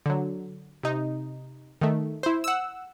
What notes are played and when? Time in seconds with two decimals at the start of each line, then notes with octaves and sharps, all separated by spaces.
0.06 D3 F#3
0.83 C3 D#4
1.81 D#3 A3
2.23 E4 C5
2.44 F#5 E6